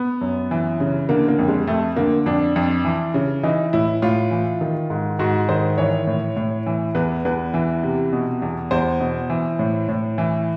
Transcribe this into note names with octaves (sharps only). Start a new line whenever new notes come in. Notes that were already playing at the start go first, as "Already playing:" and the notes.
Already playing: B3
F#2
E3
C#3
D3 A#3
A#3
F2
G#3
F2 A3
D3 A#3
F2 D4
F2
E3
C#3
E3 D#4
A2 E4
A2 F4
E3
D#3
G#2
G#2 F#4
D#3 C5
E3 C#5
A2
A2
E3
E2 B4
E2 B4
E3
C3
B2
E2
E2 C5
B2
E3
A2
A2
E3